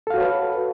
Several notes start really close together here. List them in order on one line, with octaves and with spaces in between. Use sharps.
A4 F5 F#4 C#5 B4